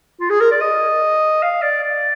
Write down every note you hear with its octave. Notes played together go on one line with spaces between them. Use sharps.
F4
G#4
A#4
D5
D#5
F5
D5
D5